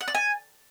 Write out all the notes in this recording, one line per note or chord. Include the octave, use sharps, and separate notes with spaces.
F#5
D5
G#5